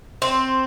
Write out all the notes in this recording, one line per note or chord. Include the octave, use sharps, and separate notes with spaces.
C4